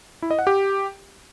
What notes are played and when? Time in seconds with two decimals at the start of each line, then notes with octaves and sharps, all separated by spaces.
0.22 E4
0.31 D#5
0.39 F#5
0.47 G4